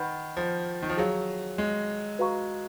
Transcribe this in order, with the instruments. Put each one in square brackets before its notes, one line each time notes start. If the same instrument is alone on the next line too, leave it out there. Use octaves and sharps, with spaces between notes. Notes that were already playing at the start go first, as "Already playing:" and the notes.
Already playing: [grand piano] D#3 [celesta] B4 F#5 B5
[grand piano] F3
D#3
F3
[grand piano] F#3 [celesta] G#4 C#5 F5
[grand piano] G#3
[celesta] F#4 B4 F5 A#5 C#6